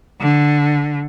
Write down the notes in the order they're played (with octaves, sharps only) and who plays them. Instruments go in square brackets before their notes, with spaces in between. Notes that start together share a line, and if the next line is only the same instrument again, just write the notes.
[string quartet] D3